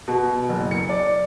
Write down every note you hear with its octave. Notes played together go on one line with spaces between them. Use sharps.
B2
F#1
C#7
D5